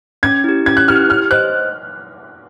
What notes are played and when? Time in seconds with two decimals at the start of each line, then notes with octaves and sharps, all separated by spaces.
0.23 C#4 G#6
0.44 E4 G4
0.66 C#4 G#6
0.77 F#6
0.88 E4 G4 F6
1.09 G4 F6
1.31 C5 D#5 F#6